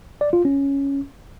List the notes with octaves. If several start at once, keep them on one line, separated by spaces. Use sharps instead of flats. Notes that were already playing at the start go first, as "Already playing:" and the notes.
D5
F4
C#4